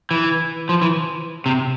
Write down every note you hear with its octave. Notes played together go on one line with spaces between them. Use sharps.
E3
F3
E3
C3